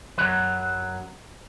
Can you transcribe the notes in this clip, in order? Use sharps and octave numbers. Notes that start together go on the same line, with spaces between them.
F#2 F#3 B4